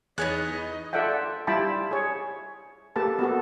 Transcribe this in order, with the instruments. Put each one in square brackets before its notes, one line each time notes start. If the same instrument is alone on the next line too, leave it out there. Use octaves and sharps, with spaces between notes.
[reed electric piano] E2 G#4 [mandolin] B3 C#5 F#6 [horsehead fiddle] D#4 D#5
[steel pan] F4 A4 D5 E5 F#5 G5
G3 E4 F4 G5 A5 B5
G#4 C#5
A#3 G4 A4 B4 A5
B3 F#4 A4